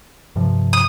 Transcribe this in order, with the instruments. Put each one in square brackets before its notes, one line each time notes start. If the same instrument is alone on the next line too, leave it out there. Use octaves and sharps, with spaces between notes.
[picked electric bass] G2 C3 F3
[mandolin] D#6